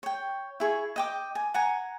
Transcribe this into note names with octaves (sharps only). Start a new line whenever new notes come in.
C#5 G5
E4 G#4 C#6
D#5 G5 D6
G#5
F#5 G#5 A#5